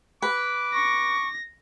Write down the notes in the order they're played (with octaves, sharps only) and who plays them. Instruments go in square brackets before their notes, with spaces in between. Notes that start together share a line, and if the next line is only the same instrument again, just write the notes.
[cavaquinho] B4 [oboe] D6
[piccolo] C#6 [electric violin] A#6